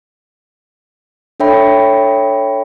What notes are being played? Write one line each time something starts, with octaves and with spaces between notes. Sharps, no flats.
D4 A4 C#5 E5 G5 B5